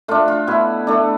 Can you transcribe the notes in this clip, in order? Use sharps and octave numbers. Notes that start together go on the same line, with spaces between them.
A3 D4 F4
F4
B2 E4
A3 D4